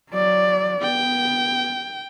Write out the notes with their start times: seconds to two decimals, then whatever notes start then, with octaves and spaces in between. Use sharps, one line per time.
0.11 F#3 D5
0.82 B3 G5